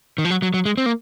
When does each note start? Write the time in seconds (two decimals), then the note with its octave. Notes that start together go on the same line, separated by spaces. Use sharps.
0.18 D#3
0.25 F3
0.30 F#3
0.42 F#3
0.54 F#3
0.66 G#3
0.78 C4
0.86 A#3